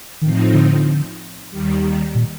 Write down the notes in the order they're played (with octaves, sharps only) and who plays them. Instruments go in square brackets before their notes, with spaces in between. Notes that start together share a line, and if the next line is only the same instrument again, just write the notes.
[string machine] A2 F3 C4 D#4 [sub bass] D#3
[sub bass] D3
[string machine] D#2 D#3 G3
[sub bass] A#2